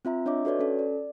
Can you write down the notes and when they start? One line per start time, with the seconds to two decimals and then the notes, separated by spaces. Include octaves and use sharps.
0.05 C4 F4 E5 A#5
0.26 D4 C#5 D#5 E5 D6
0.45 F#4 A4 B4 C#5 D5
0.59 C#4 A4
0.79 D5